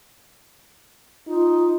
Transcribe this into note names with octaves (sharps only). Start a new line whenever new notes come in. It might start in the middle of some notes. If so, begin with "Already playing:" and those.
D#4 F4